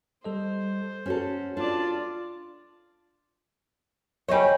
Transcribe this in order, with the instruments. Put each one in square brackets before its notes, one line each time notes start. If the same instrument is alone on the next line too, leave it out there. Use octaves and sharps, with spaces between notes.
[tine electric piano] G3 A4 D#5 [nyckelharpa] C5
[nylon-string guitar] C#4 F#4 A4 [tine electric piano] B4
[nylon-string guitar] D4 [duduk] F4 [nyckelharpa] D5 A5
[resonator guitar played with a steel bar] G3 C#5 [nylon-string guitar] C5 D#5 G#5